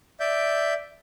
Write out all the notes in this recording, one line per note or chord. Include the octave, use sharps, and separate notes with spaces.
D5 E5 G6